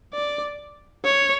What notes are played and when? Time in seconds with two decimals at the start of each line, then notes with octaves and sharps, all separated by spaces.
0.13 D5
1.05 C#5